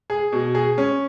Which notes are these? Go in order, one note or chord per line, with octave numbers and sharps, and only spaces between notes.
G#4
B2
G#4
C#4